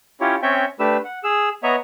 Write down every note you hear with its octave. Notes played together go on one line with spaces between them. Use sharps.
C#4 E4 F4 G4 C#5
C4 C#4 C#5 E5 G5
A3 D4 G4 B4 E6
F#5
G#4 E6
B3 C#5 D#5 E5 A#5